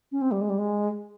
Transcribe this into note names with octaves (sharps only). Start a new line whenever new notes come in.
C#4
C4
G3
G#3
G3
G#3